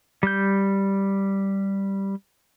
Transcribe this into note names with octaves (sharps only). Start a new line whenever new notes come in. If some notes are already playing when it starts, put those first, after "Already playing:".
G3 G6